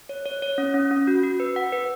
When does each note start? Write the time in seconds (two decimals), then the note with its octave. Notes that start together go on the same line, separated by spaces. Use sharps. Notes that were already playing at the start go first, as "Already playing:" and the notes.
0.09 C#5
0.26 C#5
0.42 C#5
0.58 C#4
0.74 C#4
0.91 C#4
1.07 F#4
1.23 F#4
1.40 B4
1.56 F#5
1.72 B4